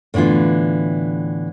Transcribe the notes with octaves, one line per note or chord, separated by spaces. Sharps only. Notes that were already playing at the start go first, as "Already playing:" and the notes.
A2 D3 E3 B3 F4